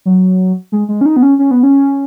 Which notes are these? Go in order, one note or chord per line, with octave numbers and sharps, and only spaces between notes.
F#3
G#3
G#3
C#4
D#4
B3
C#4
C#4
B3
C#4